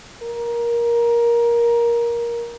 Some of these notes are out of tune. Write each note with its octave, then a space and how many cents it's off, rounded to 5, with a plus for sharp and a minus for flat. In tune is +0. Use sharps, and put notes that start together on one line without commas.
A#4 +15